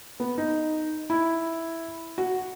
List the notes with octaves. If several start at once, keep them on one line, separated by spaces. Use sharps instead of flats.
B3
D#4
E4
F#4